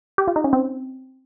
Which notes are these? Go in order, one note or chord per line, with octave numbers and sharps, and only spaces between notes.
G4
F4
D#4
C#4
C4